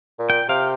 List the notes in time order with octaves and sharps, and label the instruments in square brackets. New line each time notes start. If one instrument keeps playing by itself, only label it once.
[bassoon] A#2
[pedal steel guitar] G5
[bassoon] C3 [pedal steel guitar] F5